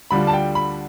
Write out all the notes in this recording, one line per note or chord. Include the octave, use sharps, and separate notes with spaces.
D2 D3 G3 D4 F4 B5
A5
G5
B5